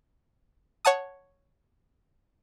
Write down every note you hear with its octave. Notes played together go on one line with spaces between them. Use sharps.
C#5 F#5 A5 D#6